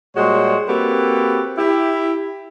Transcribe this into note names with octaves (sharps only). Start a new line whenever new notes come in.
A#2 G3 G#3 F#4 C5 C#5
A#3 C4 F#4 G4 A4 B4
E4 G4